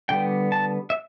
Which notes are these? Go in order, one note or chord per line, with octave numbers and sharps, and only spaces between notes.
D3 G3 B3 G5
A5
E5